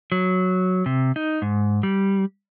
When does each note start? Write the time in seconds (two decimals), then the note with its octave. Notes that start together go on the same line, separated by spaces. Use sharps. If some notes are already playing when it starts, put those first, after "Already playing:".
0.12 F#3
0.86 C3
1.16 D#4
1.42 G#2
1.83 G3